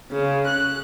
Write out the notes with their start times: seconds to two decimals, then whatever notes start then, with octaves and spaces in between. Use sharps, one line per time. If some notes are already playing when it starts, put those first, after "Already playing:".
0.10 C#3
0.46 F#6